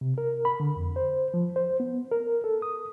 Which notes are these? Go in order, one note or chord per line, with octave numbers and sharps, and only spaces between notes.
C3
A#4
B5
D3
F2
C5
F3
C5
B3
A#4
A4
D#6